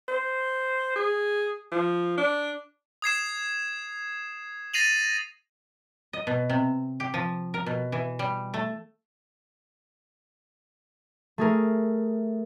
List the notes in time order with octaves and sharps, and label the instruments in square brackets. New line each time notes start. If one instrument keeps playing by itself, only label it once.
[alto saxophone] C5
G#4
F3
D4
[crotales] D#6 G#6 C7 E7
A6 A#6 C7 D#7 F7 F#7
[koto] D#5
B2
C3
G4
F3
A#4
B2
E3
G3
A3
[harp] A3 G#4 A#4